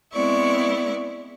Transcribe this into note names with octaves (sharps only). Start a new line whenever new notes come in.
G#3 B3 C4 E4 D5 C#6